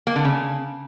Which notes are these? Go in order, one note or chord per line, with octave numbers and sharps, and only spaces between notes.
A#3
D3
C#3